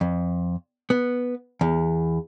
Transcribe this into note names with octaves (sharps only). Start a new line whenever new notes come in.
F2
B3
E2